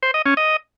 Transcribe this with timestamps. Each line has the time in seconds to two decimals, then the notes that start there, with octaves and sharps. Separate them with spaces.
0.03 C5
0.14 D#5
0.26 C#4
0.37 D#5